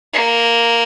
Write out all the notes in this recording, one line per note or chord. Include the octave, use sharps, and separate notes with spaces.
A#3